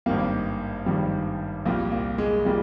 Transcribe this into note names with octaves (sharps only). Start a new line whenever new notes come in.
G#1 G2 D#3 G3 A#3
G#1 G2 D#3 G3
C2 A#2 G3 A#3
A#3
G#3
A#2 G3 A#3